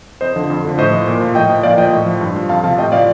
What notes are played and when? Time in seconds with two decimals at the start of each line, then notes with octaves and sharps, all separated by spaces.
0.21 F2 C5 D#5
0.36 D3 F3
0.50 F2
0.65 D3 F3
0.78 A2 C5 D#5
0.93 F3
1.07 A#2
1.21 F3
1.35 A2 D#5 G5
1.49 F3
1.63 A#2 D5 F5
1.78 F3 D#5 G5
1.93 A2
2.06 F3
2.21 G2
2.36 F3
2.49 F2 F5 A5
2.64 C3 F3 F5 A5
2.78 A2 D#5 G5
2.92 F3 D5 F5